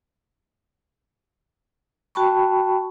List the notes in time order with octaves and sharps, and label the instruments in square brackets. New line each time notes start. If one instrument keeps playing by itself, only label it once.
[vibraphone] F#4 G5 A5 B5 C#6